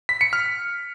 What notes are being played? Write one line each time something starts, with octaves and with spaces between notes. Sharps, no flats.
B6
C#7
F6